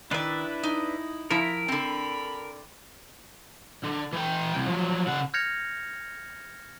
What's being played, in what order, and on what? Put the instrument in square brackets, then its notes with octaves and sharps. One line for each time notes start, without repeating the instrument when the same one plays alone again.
[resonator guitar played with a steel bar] D#3 D5 [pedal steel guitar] D4 B4 E5 [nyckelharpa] E4
[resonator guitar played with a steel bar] D#4
[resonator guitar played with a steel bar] F3 E4 [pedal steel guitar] A#4
[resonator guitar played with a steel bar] D3 C4 [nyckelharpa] B5
[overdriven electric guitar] D3
E3 G5
C2
F3 F#3
C#3 F#5
[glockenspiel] F6 G6 G#6 A#6 C#7 F7